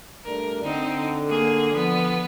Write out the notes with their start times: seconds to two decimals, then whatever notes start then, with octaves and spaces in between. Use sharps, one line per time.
0.25 G2 A3 D4 A#4
0.64 D3 C4 D#4
1.28 A#3 G#4
1.74 F3 B3